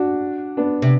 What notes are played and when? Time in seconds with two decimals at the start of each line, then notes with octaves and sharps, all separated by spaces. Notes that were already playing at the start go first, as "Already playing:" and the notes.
Already playing: D4 F#4
0.57 B3 D4
0.82 C3